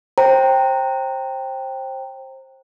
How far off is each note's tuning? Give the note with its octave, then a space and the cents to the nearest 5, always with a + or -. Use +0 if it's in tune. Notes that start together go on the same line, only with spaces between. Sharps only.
C5 +25 G5 +0 A#5 -20